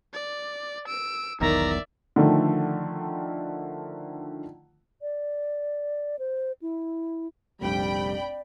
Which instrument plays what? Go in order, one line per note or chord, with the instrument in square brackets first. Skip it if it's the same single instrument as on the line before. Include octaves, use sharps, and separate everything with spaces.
[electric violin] D5
E6 D7
[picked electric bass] E1 B1 E2 [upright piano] D#3 [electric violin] D5 E5 [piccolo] A#5
[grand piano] D3 D#3 F3 A3
[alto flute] D5
C5
E4
[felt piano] F1 A#1 [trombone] G3 [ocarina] D5 [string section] G5 B5